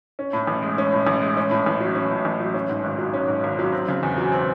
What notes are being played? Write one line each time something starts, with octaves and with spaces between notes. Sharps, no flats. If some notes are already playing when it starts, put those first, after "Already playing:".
C#4
A2
A1
G#3
C#4
A2
A1
G#3
C#4
A2
A1
F#3
C#4
A2
A1
F#3
C#4
G#2
G#1
F#3
C#4
G#2
G#1
F#3
C4
C#3
E2
F#3
C4